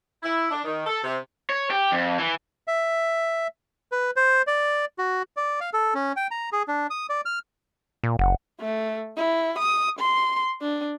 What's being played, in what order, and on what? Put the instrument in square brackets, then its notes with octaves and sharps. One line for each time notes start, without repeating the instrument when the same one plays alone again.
[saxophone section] E4
D4
D#3
A4
C3
[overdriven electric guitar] C#5
G4
F2
E3
[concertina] E5
B4
C5
D5
F#4
D5
F5
A4
C#4
G5
A#5
G#4
D4
D#6
D5
F6
[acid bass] A#2
[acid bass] F#1 [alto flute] F#5
[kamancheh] A3
E4
D#6
C6
D4